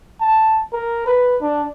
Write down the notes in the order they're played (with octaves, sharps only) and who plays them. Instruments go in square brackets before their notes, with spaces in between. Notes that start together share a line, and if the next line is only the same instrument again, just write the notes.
[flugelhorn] A5
A#4
B4
D4